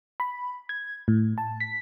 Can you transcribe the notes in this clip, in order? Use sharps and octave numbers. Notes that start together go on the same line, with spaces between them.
B5
G#6
A2
A5
B6